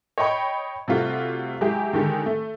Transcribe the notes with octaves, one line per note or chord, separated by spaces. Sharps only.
C#5 D#5 G5 B5 C#6
C3 G3 A3 F4 F#4
F#3 G#3 E4 G4 G#4
D3 D#3 G#3 G4
A3